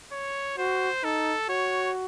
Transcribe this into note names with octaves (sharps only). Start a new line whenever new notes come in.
C#5
F#4 C5
D#4 A4
F#4 C#5